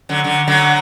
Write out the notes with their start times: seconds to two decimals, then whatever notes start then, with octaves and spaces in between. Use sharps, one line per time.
0.09 D3 F#3
0.24 D3 F#3
0.48 D3 F#3